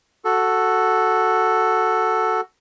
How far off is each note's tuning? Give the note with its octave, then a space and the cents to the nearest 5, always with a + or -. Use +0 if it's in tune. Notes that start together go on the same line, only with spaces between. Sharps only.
F#4 +0 A4 +0